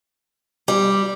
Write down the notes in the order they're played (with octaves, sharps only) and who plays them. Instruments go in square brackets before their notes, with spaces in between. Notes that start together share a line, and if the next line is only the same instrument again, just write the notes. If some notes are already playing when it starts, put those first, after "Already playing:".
[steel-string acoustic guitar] G3